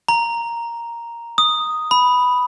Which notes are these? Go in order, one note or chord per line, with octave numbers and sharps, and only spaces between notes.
A#5
D#6
B5